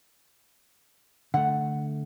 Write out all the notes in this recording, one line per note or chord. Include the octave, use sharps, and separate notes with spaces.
D3 A3 F#5